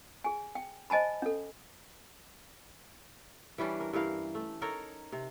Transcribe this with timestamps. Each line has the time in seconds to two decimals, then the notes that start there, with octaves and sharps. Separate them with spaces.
0.24 G#4 G#5
0.55 G5
0.90 C5 D#5 G#5 A5 B5
1.22 C#4 A4
3.58 E3 G3 C#4 D4
3.80 A#4
3.93 G2 E3 A#4 F5
4.35 A3
4.62 D#4 A4 A#4 C#5
5.12 C3